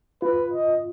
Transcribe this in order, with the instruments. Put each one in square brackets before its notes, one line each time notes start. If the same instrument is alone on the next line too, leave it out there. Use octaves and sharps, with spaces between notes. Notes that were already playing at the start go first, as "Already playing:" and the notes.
[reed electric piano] F4 [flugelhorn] B4
[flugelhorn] D#5